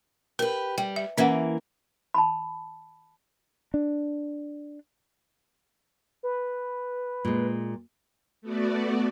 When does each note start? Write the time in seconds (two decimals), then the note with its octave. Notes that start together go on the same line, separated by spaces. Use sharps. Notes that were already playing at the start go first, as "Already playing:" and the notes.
0.39 G4 A#4 B4
0.78 G3 G5
0.96 E5
1.17 E3 A#3 C#4 B4 F#5
2.14 A5 B5
3.74 D4
6.23 B4
7.25 A#2 G#3
8.42 A3 B3 F#4 D5